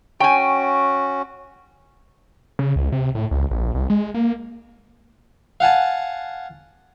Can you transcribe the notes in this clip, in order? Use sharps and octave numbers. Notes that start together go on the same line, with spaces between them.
C#4 F#4 G5 G#5
C#3
C#2
C3
A2
C#2
A#1
C2
G#3
A#3
F5 F#5 G#5 A5